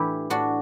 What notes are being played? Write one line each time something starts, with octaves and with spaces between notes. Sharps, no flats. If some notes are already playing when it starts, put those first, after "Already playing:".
Already playing: A2 E3 D4 E4 G4
A2 D4 F#4